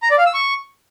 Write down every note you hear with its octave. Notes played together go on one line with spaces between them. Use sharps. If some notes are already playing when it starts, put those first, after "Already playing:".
A#5
D5
F5
E6
C#6